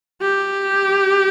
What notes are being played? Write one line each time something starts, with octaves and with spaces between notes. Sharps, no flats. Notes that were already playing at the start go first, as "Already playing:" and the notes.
G4